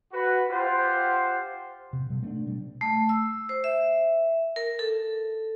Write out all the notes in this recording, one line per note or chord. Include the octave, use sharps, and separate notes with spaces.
F#4 B4
F4 G4 C5 F#5
C3
B2 G3
A3 C#4 D4
B2 G3
A3
E6
C5
E5
A#4
A4